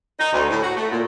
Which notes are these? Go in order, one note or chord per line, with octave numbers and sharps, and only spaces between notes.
D#4
D2
A2
F#4
A3
A#2